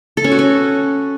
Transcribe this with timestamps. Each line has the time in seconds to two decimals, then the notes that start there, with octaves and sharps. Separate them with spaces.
0.17 A4
0.24 C#4
0.32 F#4
0.39 C#4